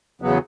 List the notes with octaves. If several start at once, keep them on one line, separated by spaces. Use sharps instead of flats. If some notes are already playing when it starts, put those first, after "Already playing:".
E2 C#3 F#3 B3